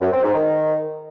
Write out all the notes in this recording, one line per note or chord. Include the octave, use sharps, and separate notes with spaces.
F#2
C4
G#2
D#3